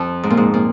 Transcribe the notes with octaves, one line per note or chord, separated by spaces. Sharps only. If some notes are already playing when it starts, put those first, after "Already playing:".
Already playing: F2
G#2
A#2
G#2
A#2